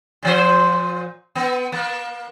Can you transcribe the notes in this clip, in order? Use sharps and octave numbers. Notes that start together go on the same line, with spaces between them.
A#2 F3 C5
B3
A#3